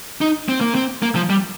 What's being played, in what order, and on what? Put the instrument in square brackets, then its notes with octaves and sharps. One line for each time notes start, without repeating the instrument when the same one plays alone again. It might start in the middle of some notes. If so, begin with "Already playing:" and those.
[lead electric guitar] D#4
C4
A#3
C4
A#3
F3
G3